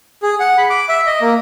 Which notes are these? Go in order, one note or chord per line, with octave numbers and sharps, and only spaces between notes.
G#4
F#5
B5
D6
E5
D#5
A#3